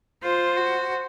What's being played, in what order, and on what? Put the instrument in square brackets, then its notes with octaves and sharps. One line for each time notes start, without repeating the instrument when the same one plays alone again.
[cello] F4 [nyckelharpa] C5
[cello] F#4